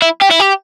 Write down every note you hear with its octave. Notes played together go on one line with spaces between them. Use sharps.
E4
G4
E4
G4